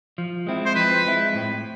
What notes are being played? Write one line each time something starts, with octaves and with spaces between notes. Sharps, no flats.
F3
G#3 C4 E4
C5
F3 B4
G#3 C4 E4
A2